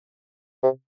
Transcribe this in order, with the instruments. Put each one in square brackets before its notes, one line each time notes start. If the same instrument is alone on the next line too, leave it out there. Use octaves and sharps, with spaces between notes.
[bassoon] C3